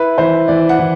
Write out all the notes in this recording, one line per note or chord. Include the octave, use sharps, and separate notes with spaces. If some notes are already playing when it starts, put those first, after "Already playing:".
Already playing: E4 B4
E3 C5
E3 D5
F#5
E3